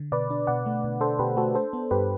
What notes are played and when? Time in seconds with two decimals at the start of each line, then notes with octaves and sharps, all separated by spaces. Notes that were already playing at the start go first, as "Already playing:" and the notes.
Already playing: D3
0.12 B2 B4 D5
0.30 D4
0.47 B2 D5 F#5
0.66 A3
0.84 B2
1.01 D4 A4 C5
1.19 B2 G4 B4
1.37 A3 F#4 A4
1.55 D4 A4 C5
1.73 B3
1.91 G2 G4 B4